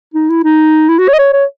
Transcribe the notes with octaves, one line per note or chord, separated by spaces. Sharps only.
D#4
E4
D#4
E4
F#4
C#5
D#5
C#5
C#5